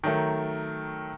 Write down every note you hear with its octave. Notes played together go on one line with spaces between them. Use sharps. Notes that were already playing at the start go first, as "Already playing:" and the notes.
D#3 F#3 A3 A#4